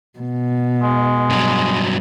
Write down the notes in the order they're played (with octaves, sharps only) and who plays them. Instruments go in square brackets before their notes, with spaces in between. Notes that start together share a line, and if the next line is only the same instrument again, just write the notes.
[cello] B2
[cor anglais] G#3
[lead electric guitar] G2 F#3